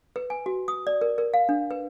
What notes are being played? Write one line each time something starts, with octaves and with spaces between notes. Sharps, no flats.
B4
G#5
F#4
D#6
D5
A#4
A#4
F5
D4
B4